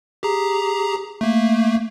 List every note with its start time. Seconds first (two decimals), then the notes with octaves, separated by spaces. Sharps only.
0.23 G4 G#4 A#5
1.21 A3 A#3